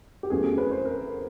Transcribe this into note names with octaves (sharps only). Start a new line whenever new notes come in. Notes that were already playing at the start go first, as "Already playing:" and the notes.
G4
E2 C#3 F#3 A3 G#4
G#4
B4
C5
A#4